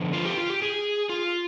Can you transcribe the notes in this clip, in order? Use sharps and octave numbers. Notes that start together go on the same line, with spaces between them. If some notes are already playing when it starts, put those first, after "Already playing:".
Already playing: D3 F3 B3
F4
G4
F4
G4
G#4
F4